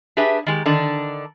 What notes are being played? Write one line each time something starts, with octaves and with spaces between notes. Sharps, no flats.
D4 G4 G#4 B4 E5
D#3 G#3 G4
D3 D#3 D4